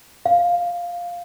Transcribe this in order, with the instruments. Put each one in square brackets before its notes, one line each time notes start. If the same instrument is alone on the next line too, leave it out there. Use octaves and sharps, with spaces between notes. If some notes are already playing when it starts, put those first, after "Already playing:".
[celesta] F5